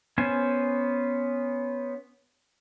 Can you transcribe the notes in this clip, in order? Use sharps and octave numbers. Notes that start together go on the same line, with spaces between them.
B3 C#4 C5 G#5